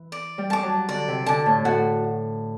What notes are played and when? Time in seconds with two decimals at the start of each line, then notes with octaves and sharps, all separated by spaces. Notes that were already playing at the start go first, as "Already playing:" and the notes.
Already playing: E3
0.12 D5
0.38 G3
0.50 A5 D6
0.63 F#3
0.89 D3 D5
1.08 C3
1.26 D3 A5 D6
1.46 A2
1.65 A2 F#4